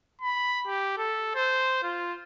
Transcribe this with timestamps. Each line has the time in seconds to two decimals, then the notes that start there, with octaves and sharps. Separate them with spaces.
0.21 B5
0.67 G4
0.98 A4
1.35 C5
1.83 F4